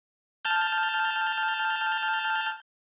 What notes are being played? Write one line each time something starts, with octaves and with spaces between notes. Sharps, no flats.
A5 F6 G6